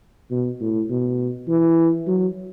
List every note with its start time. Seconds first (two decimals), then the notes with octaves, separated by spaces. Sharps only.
0.31 B2
0.61 A2
0.90 B2
1.48 E3
2.07 F#3